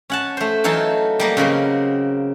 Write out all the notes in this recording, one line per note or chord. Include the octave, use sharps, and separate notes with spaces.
C#4 F#5 A5
A3 C5
E3 F#3 D#4 A4 F5 A5
G3 A#3 D#5
C#3 F#3 A#3 C4